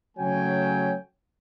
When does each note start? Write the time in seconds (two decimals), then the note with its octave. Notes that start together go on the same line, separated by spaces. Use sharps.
0.18 C#3 F#3 A3 C#5 G5 G#5